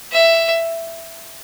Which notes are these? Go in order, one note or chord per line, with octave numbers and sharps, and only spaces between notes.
E5